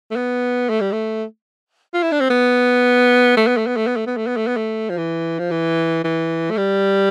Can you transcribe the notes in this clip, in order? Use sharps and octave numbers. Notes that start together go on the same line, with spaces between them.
A3
B3
A3
G3
A3
F4
E4
D4
C4
B3
A3
B3
A3
B3
A3
B3
A3
B3
A3
B3
A3
B3
A3
F3
E3
F3
E3
E3
A3
G3